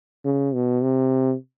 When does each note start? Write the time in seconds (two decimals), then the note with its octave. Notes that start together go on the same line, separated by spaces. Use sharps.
0.25 C#3
0.54 B2
0.83 C3